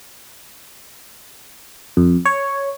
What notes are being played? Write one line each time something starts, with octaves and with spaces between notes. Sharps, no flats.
F2
C#5